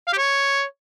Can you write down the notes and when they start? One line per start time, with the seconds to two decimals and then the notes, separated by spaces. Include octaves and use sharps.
0.08 F5
0.13 G4
0.18 C#5